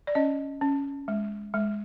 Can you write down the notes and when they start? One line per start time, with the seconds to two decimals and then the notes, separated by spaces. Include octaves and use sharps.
0.07 D5
0.15 C#4 D#5
0.61 C#4
1.08 G#3
1.54 G#3